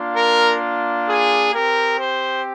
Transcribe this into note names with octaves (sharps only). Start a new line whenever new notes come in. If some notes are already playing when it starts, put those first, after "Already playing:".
Already playing: A#3 D4 F4
A#4
G#4
C4 G4 A#4
C5